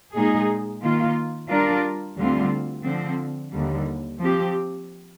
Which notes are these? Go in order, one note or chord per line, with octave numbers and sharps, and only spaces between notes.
A#2 G#3 D#4 G#4
D#3 A#3 F4
G3 D4 F4 A#4 D5
D2 D3 G3 C4 F4
D3 F3 C4
D#2 D3 G3
F3 C4 G4